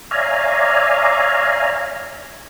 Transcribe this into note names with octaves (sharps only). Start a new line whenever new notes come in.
C#5 D5 E5 F5 G#5 A#5